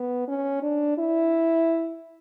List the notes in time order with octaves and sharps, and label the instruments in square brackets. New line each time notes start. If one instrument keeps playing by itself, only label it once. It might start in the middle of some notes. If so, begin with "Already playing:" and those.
Already playing: [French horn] B3
C#4
D4
E4